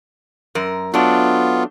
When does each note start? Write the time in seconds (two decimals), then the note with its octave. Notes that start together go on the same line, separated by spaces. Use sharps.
0.55 F#2 A#4
0.94 F#3 A3 B3 D4 F4